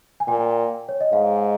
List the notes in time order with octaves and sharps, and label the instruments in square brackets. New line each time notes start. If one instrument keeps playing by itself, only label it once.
[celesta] G#5
[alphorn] A#2 [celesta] G5
[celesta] C#5
D#5
[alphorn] G#2 [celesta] F5